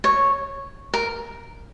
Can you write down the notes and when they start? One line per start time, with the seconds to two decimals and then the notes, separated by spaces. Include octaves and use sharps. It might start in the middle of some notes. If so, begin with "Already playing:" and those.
0.04 C#5
0.94 A#4